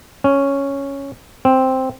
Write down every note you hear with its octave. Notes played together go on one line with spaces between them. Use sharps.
C#4
C4